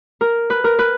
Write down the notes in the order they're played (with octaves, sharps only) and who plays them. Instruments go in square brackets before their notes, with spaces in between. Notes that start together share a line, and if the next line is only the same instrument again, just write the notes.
[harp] A#4
B4
A#4
B4